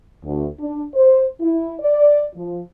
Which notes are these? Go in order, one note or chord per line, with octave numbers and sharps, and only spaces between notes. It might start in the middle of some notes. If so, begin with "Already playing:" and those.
D2
D4
C5
E4
D5
F3